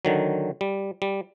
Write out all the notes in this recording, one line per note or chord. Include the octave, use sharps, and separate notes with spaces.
D3 D#3 F#3
G3
G3